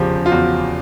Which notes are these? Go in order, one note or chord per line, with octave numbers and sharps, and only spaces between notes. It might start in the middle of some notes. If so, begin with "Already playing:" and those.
Already playing: E2 C#3 F3 G4
F4
E2 F#4